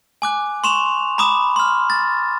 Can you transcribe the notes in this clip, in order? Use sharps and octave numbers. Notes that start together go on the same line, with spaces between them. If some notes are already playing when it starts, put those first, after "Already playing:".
G#5 D6 F#6
C6 C#6 E7 F7
A#5 B5 D6 D#6 E7
C6 F6
A6